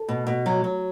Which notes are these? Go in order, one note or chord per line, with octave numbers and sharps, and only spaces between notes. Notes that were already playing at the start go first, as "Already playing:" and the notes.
Already playing: A4
B2
B2
F#3
F#3